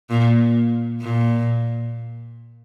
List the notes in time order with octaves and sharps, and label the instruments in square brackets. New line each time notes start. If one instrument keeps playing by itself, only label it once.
[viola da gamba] A#2
A#2